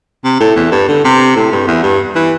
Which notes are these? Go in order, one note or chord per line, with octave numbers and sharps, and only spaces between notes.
C3
A2
E2
G2
D3
C3
A2
G2
E2
G2
E3